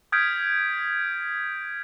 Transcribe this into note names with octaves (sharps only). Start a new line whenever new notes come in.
D#6 F6 G6 G#6 B6 D7